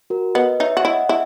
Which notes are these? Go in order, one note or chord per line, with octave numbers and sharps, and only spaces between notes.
F#4 A#4
B3 B4 D#5
D#4 C#5 E5
F#4
E4 D#5 F#5
E4 E5